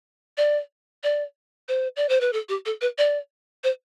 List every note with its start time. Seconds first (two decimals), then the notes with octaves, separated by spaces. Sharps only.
0.37 D5
1.03 D5
1.68 C5
1.96 D5
2.09 C5
2.21 B4
2.33 A4
2.49 G4
2.66 A4
2.81 B4
2.98 D5
3.64 C5